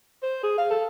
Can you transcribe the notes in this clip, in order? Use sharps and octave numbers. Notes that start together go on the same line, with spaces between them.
C5
G#4
F5
A4